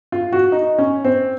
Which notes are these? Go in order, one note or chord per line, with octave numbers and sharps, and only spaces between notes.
F4
F#4
D#4
C#4
C4